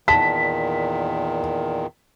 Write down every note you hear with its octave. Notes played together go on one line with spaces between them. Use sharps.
E2 A#2 D#3 A5 B6